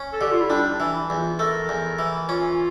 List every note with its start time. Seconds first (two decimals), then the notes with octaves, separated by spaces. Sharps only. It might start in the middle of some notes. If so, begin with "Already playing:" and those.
Already playing: C#4
0.13 A4
0.21 D3 G4
0.31 F4
0.41 E4
0.50 G3 D4
0.72 D4
0.80 E3
0.95 E4
1.10 E2
1.17 F4
1.39 A3 A#4
1.69 E2
1.99 E3
2.29 C#4 F4